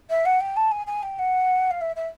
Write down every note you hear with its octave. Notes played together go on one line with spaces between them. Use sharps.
E5
F#5
G5
A5
G#5
G#5
G5
F#5
F5
E5
E5